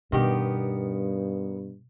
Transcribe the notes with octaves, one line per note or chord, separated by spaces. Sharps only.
G2 B2 D#3 B3 G4